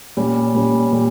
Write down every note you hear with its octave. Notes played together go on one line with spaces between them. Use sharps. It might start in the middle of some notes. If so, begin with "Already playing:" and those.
A#2 G3 C#4
A#2 G3 C#4
A#2 G3